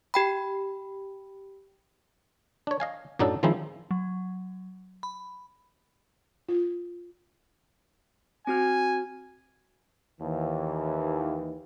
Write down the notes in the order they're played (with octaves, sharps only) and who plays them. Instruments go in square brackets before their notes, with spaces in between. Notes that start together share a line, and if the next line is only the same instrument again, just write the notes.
[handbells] G4 G5 B5
[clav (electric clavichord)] D4 C#5
D#5 F5 G#5
F#2 A2 F#3 D4 D#4 A4
D#3 F3 G#3 C4 D#4 E4
[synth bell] F#3
B5
[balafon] F4
[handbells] C4 F#4 F6 [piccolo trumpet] G#5
[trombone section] D#2 E3